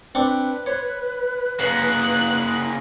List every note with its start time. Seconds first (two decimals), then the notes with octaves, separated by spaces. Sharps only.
0.15 C4 D4 B4 C#6
0.66 C5 C#5
1.60 C#3 A#3 F#6